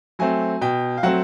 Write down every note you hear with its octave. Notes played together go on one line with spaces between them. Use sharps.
F#3 A3 C4 G#5
B2 G5
F5
F#3 A3 C4 F#5